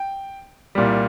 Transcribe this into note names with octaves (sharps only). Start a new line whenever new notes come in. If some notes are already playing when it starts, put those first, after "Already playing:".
Already playing: G5
C2 A#2 G3